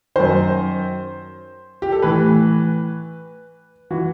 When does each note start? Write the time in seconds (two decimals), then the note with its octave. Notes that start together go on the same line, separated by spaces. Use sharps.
0.16 F#2 D#3 C5
1.82 G4
1.92 A4
2.02 A2 E3 B4
3.90 E3 F#4